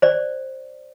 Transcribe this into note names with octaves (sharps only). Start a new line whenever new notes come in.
C5 D5